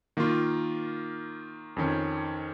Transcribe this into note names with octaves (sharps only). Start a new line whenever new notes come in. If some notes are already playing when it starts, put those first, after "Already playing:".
D#3 A#3 F4
F2 D#3 C#4